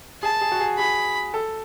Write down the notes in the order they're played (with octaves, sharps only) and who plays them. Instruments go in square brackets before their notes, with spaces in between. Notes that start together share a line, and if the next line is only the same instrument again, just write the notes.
[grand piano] G#4 [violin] A5
[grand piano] G#4
F#4
G#4
[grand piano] G#4 [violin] B5
[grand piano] A4